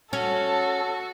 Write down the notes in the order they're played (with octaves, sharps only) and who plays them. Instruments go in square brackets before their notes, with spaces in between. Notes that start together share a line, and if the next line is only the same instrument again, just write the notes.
[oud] C#4 [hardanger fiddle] F#4 [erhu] A4